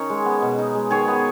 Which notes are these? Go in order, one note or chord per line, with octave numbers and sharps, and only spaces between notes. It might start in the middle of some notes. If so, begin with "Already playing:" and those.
Already playing: D#3 C#4 D#4 C#5
G#3
B3
B2
D#4
G#3
D#3 G#4 C#5
B3